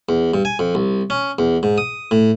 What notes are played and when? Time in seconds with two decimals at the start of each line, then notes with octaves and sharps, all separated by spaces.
0.09 E2
0.34 G2
0.45 G#5
0.59 F2
0.75 C2
1.10 C#4
1.39 E2
1.63 G#2
1.78 D#6
2.11 A2